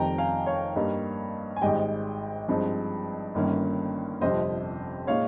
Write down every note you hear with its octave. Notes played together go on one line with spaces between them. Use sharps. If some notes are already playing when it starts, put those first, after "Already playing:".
Already playing: F1 F2 D#3 G3 G5 A#5
F5 G#5
C#5 F5
G2 G3 A#3 D#4
G#5
G#1 G#2 G3 D#5 G5
G2 F3 G#3 C4 D#4
G1 G2 D#3 A#3 C#4
G1 F2 C3 F3 C5 D#5
A#2 G#3 D#4 C#5 F5